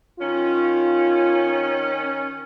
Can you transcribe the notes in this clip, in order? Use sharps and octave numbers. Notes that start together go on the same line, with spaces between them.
D#3 C#4 F4